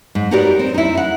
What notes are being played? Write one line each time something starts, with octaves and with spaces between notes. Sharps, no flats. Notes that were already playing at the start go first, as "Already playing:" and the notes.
G#2
D#4 F#4 G4 A#4 B4 D5
C4
D#4 E4
F#5